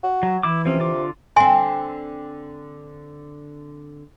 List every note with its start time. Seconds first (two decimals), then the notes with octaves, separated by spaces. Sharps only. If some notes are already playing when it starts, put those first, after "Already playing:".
0.03 F#4
0.23 F#3
0.43 E3 E4 D6
0.65 C3 F3 C4 C#4
0.79 D3 F4 D6
1.36 D3 C4 E5 G#5 C6